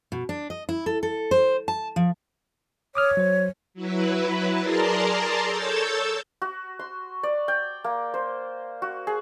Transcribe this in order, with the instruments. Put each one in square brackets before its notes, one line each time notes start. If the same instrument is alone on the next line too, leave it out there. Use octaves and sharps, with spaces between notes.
[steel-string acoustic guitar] B2
D4
D#5
E4
A4
A4
C5
A5
F3
[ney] C#5 [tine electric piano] D6 D#6 F6
[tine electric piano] F#3 C5
[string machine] F#3 E4 B4
G#4 A#4 D5 A5 A#5 C6
A4 C#5 E6 G6 A6
[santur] F#4
C6
D5
G5
A#3
C5
F#4
G#4